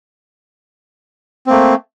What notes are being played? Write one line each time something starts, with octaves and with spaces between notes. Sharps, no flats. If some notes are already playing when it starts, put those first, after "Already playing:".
A3 A#3 C4